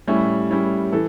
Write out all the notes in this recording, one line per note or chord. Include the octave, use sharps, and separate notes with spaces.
A2 G3 C#4 E4
A2 G3 C#4 E4
E3 A4